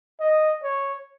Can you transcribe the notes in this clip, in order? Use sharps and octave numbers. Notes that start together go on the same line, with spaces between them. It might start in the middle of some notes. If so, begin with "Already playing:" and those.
D#5
C#5